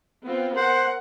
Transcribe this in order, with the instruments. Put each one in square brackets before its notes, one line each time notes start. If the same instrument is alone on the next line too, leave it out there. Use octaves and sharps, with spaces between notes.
[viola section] B3 C4 F4
[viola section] A#4 F#5 [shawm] C5